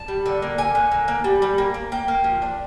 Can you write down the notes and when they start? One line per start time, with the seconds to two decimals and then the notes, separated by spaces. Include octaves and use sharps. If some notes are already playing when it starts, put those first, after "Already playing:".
Already playing: A5
0.08 G3
0.26 D3
0.42 A#3
0.58 D3 G#5
0.75 D3
0.92 A#3
1.08 A#3
1.24 G3
1.42 G3
1.58 A#3
1.74 A#3
1.92 A#3 G5
2.08 A#3
2.24 F3
2.42 D4